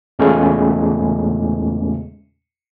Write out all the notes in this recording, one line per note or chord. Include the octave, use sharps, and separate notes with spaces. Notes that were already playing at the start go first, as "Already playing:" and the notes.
E2 A#2 C#3 G#3 A3 C#4